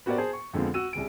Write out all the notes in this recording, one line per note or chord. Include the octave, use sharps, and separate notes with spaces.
B3 F#4 G4 A#4 C5 D5
G#4 C5 A5
C#6
F2 D3 G#3 B3 C4 F4
F#4 E6 D#7
C2 C#3 D7